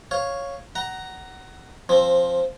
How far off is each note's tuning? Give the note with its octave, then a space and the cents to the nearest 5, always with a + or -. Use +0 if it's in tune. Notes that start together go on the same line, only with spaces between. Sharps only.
C#5 +0 F5 +5
F#5 +20 A#5 +0
F3 +0 C4 +15